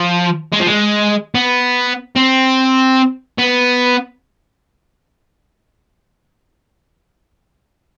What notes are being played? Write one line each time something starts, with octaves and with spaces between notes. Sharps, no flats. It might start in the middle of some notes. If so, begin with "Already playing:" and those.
Already playing: F3
G#3
F3
G#3
B3
C4
B3